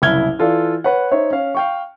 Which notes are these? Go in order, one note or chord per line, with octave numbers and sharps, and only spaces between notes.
F#1 C2 E4 F6 G#6 G7
E3 F4 A4 D5
B4 C#5 F#5
D#4 C5 C#5 E5
C#4 F5
F5 G5 C#6